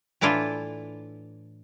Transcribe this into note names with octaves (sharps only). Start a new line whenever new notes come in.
A2 E3 D4 E4 F4